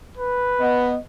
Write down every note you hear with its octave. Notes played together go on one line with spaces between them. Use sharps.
B4
B3 D#5